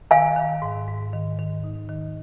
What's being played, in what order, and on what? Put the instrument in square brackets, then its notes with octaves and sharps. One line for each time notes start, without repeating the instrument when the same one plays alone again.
[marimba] D#3 [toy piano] F5 G#5
[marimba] D#3
G#2
G#2
D#3
D#3
D#4
D#3